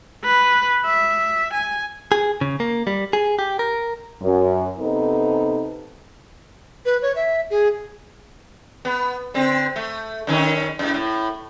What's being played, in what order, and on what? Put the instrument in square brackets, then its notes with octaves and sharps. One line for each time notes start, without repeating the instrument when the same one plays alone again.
[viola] B4
E5
G#5
[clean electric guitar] G#4
C#3
A#3
G3
G#4
G4
A#4
[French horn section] F#2
C3 B3 D#4 A4
[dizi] B4
C#5
E5
G#4
[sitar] B3
D3 C4
A3
F#2 D#3 C#4
F#2 A2
A2